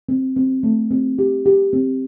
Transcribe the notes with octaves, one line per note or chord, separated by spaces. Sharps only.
C4
C4
A3
C4
G4
G4
C4